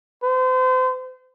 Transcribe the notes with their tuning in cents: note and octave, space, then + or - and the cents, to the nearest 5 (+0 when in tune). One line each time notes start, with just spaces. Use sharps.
C5 -35